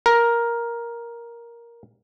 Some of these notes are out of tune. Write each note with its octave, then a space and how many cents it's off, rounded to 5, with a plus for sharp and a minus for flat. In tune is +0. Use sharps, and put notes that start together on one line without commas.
A#4 +10